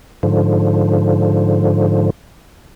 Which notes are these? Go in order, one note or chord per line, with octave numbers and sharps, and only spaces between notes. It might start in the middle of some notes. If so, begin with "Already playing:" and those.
G#2 D3 F3